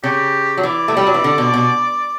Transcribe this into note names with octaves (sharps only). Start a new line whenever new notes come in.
C#3 G4
F#3
E3 D5
A3
G3
F#3
E3
D3
B2
B2